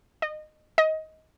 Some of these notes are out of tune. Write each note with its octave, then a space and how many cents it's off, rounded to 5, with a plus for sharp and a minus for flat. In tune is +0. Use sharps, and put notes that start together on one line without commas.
D#5 -25
D#5 +20